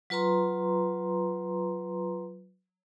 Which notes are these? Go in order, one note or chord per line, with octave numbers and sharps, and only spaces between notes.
F#3 F4 B4 A#5 C6